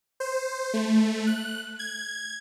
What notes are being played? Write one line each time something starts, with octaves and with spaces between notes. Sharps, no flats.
C5
A3
F#6
G#6